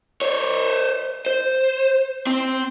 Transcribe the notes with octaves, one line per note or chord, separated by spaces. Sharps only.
C5 C#5
C5
C4